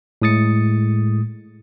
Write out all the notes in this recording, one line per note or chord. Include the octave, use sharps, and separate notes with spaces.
A2 G#3 D#6 A6 C#7